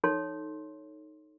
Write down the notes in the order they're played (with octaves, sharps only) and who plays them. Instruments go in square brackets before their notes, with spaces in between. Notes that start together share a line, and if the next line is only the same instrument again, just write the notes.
[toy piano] D#4 A4 C#5 C6